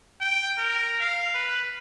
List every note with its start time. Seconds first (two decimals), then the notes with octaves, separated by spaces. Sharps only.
0.20 G5
0.58 A#4
1.00 F5
1.34 B4